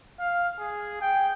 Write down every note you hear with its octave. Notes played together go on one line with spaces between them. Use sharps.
F5
G#4
G5